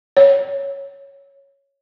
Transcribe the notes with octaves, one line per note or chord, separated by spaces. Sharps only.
C#5